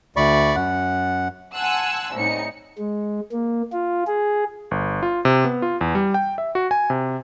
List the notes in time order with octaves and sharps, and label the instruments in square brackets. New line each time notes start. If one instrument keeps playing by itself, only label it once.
[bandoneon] D2 D5 B5 C#6
F#2 F#5
[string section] F#5 G#5 A5 C6 E6 F#6
C2 A2 C#4 D#4 C#7
[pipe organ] G#3
A#3
F4
G#4
[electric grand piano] G1
F4
C3
B3
F4
E2
G3
G5
E5
F#4
G#5
C3